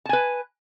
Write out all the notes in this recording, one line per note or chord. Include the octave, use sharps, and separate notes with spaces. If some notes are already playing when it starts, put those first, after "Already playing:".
B4 G#5 A5